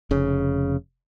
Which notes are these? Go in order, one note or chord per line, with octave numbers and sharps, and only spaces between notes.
F1 C#3